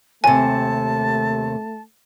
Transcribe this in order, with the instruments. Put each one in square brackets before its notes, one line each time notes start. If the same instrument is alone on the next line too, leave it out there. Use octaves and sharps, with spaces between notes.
[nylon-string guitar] D#2 C3 [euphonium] A3 [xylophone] G#5 [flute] A5